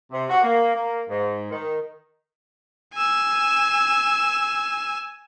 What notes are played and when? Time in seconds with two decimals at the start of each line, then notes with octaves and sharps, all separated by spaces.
0.12 C3
0.30 F#4
0.42 A#3
0.74 A#3
1.10 G#2
1.51 D#3
2.95 G#5 E6